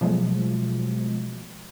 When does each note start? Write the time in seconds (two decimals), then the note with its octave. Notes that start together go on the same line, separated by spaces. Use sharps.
0.01 B2 F3 F#3 G#3 A3